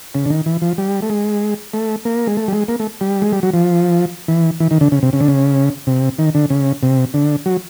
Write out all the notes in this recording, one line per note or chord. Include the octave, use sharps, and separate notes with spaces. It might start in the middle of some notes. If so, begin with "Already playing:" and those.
C#3
D3
D#3
E3
F3
G3
A3
G#3
A3
A#3
G#3
A3
G3
G#3
A#3
A3
G3
G#3
G3
F#3
F3
E3
E3
D#3
D3
C#3
C3
C#3
D3
C#3
C3
D#3
D3
C#3
C3
D3
F#3